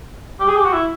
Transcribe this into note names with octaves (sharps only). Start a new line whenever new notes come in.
G4
G#4
G4
F#4
E4